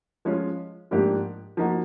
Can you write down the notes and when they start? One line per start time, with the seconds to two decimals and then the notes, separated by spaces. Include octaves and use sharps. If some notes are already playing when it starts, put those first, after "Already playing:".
0.25 F3 G#3 C#4 F4
0.91 G#2 F3 A#3 D4 G4
1.57 F3 A#3 D#4 F#4